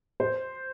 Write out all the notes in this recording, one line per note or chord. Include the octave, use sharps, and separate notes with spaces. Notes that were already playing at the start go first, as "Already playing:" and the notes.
C5